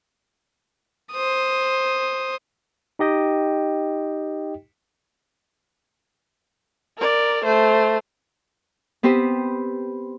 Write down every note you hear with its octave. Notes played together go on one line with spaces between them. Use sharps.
C5 D#6
D#4 G4 D#5 G5
A#4 D5
A3 C5
B3 C4 G4 B4 C5